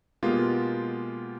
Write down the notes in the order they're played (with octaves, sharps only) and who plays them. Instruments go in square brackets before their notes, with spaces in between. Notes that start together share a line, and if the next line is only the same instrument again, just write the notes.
[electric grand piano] B2 G#3 A#3 B3 F4 G4